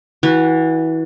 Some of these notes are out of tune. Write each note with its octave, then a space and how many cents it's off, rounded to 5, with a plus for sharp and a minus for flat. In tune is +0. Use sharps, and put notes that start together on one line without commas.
E3 -25 F#4 +0